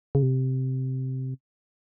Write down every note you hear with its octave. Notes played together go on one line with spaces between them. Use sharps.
C#3
C3